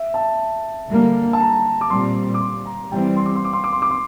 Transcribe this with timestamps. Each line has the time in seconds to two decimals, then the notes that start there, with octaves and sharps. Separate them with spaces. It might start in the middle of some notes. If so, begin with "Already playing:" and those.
Already playing: E5
0.14 A5
0.89 D3 G3 A#3
1.33 A5
1.40 A#5
1.81 D6
1.90 A#2 G3 C4 C6
2.34 D6
2.40 C6
2.66 A#5
2.91 E3 G3 C4 G5
3.16 C6
3.26 D6
3.36 C6
3.45 D6
3.53 C6
3.64 D6
3.73 C6
3.82 D6
3.91 C6